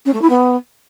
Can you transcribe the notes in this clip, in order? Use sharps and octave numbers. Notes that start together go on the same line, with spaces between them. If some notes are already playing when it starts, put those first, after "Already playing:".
C#4
A3
E4
B3